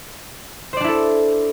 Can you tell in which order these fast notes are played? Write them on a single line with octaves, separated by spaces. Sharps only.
C5 D5 D4 E4 A4